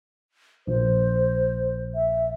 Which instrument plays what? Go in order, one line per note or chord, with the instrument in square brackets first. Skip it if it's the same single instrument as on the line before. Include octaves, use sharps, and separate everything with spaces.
[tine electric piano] A#1 [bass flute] C5
[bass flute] E5